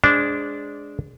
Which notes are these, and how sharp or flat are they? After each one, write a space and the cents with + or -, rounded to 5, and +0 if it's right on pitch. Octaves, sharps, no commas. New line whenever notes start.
G#3 +0 D4 -15 C5 +0